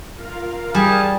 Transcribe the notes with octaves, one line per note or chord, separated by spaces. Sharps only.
F4 A#4 F5
G3 G#4 A5